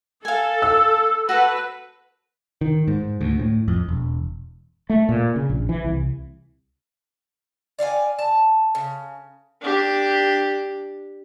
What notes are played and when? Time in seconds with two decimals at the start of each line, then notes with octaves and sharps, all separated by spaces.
0.25 A4 F5 G#5
0.62 E6
1.29 F#4 A4 B4
2.61 D#3
2.88 G#2
3.21 D2
3.39 A2
3.68 F2
3.89 E1
4.90 A3
5.09 A#2
5.36 C#3
5.50 A#1
5.69 E3
5.84 C2
7.79 D5 F5 G5 G#5
8.19 A5
8.75 C#3
9.62 D4 G4